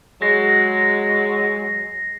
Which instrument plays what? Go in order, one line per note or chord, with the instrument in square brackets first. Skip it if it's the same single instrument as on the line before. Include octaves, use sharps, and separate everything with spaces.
[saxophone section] F#3 G#3 [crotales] A#6 C7